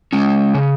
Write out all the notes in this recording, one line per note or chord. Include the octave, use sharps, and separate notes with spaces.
G#3 C#4
C#3